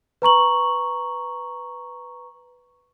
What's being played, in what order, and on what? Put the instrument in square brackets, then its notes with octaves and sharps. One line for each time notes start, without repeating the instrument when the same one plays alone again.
[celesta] B4 A#5 C#6 F#7